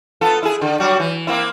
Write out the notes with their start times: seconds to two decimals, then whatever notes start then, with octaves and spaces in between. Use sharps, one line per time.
0.21 B3 F4 A4
0.43 E4 G#4
0.61 D3
0.80 F#3 G3 F#4
1.00 E3
1.27 A#3 C4 E4